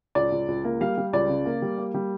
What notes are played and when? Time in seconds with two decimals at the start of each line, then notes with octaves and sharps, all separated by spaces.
0.15 C#2 D5
0.32 C#2
0.48 C#2
0.65 A#3
0.80 G3 F5
0.98 G3
1.13 C#2 D5
1.29 C#3
1.46 A#3
1.62 G3
1.78 A#3
1.94 G3